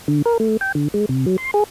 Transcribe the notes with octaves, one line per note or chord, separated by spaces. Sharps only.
D3
A#4
A3
G5
D3
G#3
C3
F#3
C6
G#4